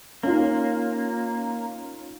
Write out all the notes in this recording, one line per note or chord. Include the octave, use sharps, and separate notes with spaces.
A#3 C#4 D#4 F4